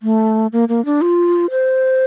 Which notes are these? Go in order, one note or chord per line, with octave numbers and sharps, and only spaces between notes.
A3
A#3
A#3
D4
F4
C5